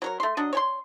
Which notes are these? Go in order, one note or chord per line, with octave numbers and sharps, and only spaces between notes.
F#3 A#4 C#5
A3 C6
F#3 D4 D#5
C#5 G5 C6